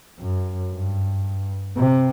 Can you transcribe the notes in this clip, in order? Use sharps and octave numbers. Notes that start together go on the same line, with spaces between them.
F#2
G2
C3